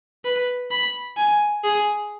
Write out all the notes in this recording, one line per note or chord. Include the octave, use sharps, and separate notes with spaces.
B4
B5
G#5
G#4